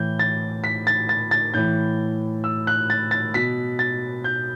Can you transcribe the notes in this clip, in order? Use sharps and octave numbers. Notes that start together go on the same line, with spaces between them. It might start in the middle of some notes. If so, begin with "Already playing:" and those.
Already playing: A2 E3 G6
A6
B6
A6
A6
A6
A2 E3 G6
E6
F#6
A6
A6
B2 B6
A6
G6